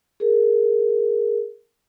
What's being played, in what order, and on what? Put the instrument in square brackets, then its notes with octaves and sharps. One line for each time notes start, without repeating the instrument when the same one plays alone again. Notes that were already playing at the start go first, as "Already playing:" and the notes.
[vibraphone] G#4 A#4